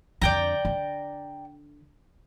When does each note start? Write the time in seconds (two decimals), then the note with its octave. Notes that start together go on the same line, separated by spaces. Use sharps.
0.22 F2 D3 D5 G5 A#5
0.65 D3